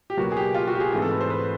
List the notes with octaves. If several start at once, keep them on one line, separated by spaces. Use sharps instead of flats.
G4
C#2 B2 F#3 A#3 F#4
G#4
G4
F4
F#4
G4
G#4
G#2 E3 A3 C4 G#4
A4
B4
C5
B4